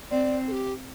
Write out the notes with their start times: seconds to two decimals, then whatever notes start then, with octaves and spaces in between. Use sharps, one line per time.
0.11 C4 D5
0.47 A4
0.52 G4